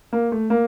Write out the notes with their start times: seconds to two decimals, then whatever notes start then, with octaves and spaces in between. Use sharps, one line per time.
0.13 A#3
0.32 A3
0.50 A#3